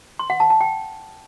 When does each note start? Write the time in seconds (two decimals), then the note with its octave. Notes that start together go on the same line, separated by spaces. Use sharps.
0.19 C6
0.30 F#5
0.40 A5
0.50 A5
0.61 G5